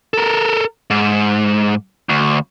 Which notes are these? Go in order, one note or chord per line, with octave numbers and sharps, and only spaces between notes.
A4 A#4
G#2
D2